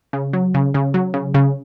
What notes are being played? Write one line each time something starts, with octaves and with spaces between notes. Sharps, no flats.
C#3
F#3
C#3
C#3
F#3
C#3
C#3